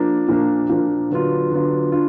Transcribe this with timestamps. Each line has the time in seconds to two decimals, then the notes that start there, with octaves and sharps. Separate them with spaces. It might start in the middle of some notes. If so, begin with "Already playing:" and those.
Already playing: F3 A#3 D4
0.28 A#2 F3 A#3 D4
0.69 A#2 F3 A#3 D4
1.11 D3 F#3 B3 D4 F4
1.51 D3 F#3 B3 D4 F4
1.92 D4 F4